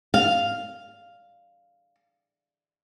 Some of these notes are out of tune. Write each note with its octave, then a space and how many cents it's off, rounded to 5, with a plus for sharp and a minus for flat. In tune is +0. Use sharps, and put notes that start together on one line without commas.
F5 +0